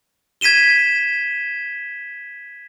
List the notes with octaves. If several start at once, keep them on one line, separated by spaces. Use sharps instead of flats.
G#6 B6 D#7 E7 G7